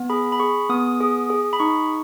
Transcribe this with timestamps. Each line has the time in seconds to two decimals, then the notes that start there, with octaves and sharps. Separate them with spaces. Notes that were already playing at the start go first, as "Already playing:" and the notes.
Already playing: B3
0.10 G#4 B5
0.32 B5
0.40 G#4 C#6
0.69 B3 D#6
1.00 G#4
1.30 G#4
1.53 B5
1.60 D#4 C#6